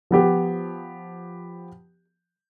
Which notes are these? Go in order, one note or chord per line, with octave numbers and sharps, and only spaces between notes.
F3 B3 G4